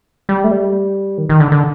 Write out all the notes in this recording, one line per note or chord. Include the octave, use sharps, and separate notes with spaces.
G3
A3
G3
D#3
D#3
D3
D3